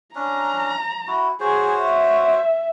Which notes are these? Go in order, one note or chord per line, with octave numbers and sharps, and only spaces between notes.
C#4 D4 A#5
E4 F#4
F#4 G#4 C5 C#5
E5